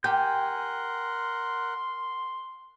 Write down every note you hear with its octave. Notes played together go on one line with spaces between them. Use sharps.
G4 A#4 F#5 G#5 C6 G6